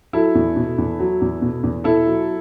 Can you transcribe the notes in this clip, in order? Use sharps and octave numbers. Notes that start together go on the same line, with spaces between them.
F#3 E4 A4
E2
B2
E2
F#3
E2
B2
E2
B2 E4 A4
F#3